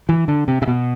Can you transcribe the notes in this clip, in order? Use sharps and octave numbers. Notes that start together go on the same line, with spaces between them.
E3
D3
C3
C3
B2